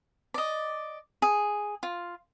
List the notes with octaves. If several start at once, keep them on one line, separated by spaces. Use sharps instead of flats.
D5 D#5
G#4
F4